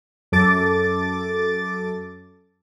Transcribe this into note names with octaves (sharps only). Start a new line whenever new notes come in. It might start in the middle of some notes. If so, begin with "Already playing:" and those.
F#2 A4 D6 A6